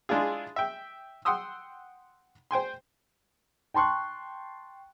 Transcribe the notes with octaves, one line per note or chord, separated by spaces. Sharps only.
G#3 D4 E4 F4 G#4
E5 G5
F#5 G5 C6 D#6 E6
C5 G5 G#5 C6
G5 A5 C6 C#6 F#6